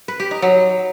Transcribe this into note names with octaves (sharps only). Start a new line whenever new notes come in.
B4
G4
D#4
F#3